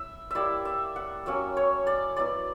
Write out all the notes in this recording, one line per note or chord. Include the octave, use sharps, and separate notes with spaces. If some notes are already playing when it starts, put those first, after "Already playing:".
Already playing: E4 E5
G3 A#3 E4 D5 E5
E5
F#5
F#3 A#3 C#4 E5
C#5
D5
F#3 B3 E4 D5